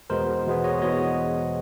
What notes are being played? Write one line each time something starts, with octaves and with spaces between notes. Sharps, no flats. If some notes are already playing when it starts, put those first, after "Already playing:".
E2 B2 G#3 B3 A#4 C5
E2 B2 G#3 B3
C#5 D#5
E2 B2 G#3 B3 C#5 D#5